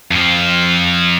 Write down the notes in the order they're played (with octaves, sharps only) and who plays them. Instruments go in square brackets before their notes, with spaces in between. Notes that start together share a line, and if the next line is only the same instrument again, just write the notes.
[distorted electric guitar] F2 F3